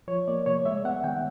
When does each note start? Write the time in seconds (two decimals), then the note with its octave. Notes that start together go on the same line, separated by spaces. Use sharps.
0.08 F3 C#5
0.28 A#3 D5
0.46 C3 C#5
0.65 G#3 E5
0.85 B3 F#5
1.04 D#3 G5